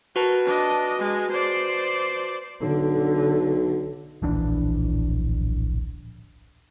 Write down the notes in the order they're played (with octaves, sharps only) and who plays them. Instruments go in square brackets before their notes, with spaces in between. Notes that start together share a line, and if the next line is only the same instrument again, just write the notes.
[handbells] F#4 B4 A5 [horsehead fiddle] A#4
[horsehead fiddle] D4 D#5
G#3
C5 D5
[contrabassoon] B1 [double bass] D3
[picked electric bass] D1 A#1 E3 D4